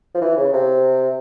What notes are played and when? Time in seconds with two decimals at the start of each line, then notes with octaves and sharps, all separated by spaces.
0.14 F3
0.21 E3
0.37 C#3
0.53 C3